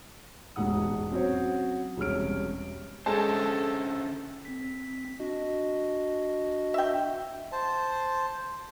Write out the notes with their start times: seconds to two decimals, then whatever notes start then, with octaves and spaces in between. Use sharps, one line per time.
0.56 E1 A1 G#2 F#5 D#6
1.12 F#3 C4 C#4 F#4 C5 C#5
1.97 E1 C2 C#4 F6 D7
3.06 D3 G#3 C#4 A4 C5 A5
4.45 C4 B6
5.20 D4 F#4 D#5
6.74 E5 G5
7.52 C5 A5